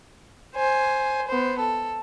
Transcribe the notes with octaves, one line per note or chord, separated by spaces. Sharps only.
C5 G#5
B3 C5
A4